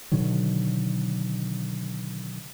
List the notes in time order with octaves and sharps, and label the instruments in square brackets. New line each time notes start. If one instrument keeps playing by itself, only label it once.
[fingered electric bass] B2 D3 D#3 F#3